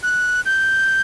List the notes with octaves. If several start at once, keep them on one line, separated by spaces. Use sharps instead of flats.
F#6
G6